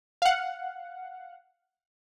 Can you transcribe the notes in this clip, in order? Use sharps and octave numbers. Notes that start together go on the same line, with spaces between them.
F5 F#5